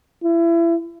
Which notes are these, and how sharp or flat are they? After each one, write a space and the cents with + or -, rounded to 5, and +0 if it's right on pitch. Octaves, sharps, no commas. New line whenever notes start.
E4 +30